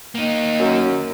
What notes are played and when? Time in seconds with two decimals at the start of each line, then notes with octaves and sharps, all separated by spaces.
0.15 A#3 D#4
0.59 F#2